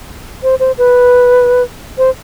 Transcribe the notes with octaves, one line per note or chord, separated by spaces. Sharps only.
C5
C5
B4
C5